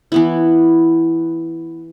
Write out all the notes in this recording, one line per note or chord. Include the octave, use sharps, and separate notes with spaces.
E3 B3 E4